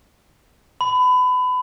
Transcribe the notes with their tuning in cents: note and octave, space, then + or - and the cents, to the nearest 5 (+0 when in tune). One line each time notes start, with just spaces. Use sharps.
B5 +25